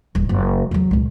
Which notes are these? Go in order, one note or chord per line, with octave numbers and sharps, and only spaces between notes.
D#1 A1
F#1
E2 F#3
C#2 A#2